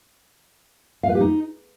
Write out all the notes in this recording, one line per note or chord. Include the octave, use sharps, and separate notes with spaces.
F5
B4
G4
D#4